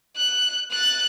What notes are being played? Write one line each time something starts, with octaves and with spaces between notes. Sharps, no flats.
F#6
F#6 A6